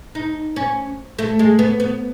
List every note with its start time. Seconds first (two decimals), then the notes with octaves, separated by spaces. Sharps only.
0.15 D#4
0.56 C#4
1.19 A3
1.39 G#3
1.59 B3
1.80 B3